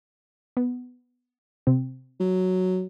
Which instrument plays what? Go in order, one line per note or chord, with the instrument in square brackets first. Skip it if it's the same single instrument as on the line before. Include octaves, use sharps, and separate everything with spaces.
[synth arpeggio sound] B3
C3 C4
[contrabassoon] F#3